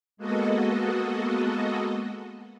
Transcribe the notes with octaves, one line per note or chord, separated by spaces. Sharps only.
G#3 A#3 B3 F#4 A4 D#5